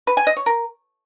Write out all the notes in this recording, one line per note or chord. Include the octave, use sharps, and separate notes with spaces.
B4
G#5
D#5
C#5
A#4